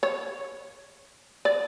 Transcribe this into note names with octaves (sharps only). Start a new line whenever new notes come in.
C#5
D5